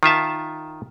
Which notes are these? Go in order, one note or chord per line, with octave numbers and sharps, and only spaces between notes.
D#3 F4 E5 A5